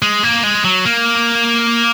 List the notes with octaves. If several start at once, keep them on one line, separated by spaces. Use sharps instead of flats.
G#3
A#3
G#3
F#3
A#3